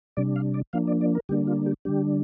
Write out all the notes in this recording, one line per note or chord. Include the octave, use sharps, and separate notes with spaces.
C3 G3 D4 D5
F5
D5
F3 A#3 D4 F5
D5
D5
A#4
D3 G3 A#3 D4 G4
F4
G4
D3 G3 D4 G4